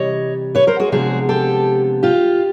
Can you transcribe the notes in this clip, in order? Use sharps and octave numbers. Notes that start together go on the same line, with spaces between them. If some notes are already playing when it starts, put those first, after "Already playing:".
Already playing: C3 E3 G3 C#5 D#5
B4 C#5
A#4 C5
F#4 G#4
C3 F3 G#3 B3 D4 F#4 G#4
G4 A4
F4 G4